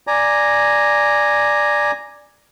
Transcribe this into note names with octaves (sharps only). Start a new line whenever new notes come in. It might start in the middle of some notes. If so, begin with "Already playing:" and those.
D5 G#5 A#5